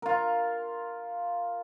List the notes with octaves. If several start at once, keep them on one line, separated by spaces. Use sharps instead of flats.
F4 A#4